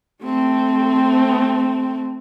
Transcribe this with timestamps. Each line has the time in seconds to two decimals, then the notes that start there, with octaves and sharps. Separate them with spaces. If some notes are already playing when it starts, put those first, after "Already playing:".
0.24 A3 C4